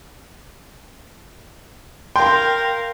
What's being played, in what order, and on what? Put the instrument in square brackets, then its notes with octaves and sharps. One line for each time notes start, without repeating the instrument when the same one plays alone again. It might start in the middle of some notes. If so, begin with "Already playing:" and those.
[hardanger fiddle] A#4 F5 [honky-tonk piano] G5 [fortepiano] C6